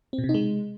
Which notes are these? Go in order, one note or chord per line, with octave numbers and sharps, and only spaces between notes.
C4
B2
C3
D#4
G#3